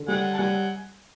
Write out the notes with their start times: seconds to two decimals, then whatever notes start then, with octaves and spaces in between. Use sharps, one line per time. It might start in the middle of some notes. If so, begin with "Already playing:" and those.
Already playing: D3
0.08 G3 F#5 G#5
0.34 A5
0.38 G3 F#5 G#5